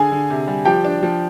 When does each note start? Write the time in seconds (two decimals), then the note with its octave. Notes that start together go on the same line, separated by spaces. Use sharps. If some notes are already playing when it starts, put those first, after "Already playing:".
Already playing: D3 G#4 G#5
0.12 D3
0.30 C3
0.47 G3
0.65 F3 G4 G5
0.85 D4
1.03 F3